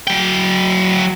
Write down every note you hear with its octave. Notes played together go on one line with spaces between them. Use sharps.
F#3 G5